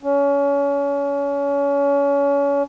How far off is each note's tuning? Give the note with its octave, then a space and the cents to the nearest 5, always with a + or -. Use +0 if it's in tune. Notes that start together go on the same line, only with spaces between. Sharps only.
C#4 +30